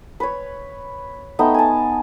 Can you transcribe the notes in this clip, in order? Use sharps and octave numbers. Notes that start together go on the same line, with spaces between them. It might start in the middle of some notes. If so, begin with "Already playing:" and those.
B4 C#5
A3 B3 D#4 G5
G#5 A5